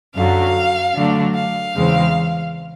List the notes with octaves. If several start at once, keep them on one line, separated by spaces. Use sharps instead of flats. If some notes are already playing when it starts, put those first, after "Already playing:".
F#2 D3 F#3 F5
D3 F#3 A3 D4
F5
E2 C#3 E3 G#3 C4